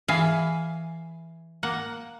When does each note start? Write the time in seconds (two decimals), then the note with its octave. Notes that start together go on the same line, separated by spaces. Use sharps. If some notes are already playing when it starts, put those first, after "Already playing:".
0.08 E3 G#4 E5 F5
1.63 A#3 F#5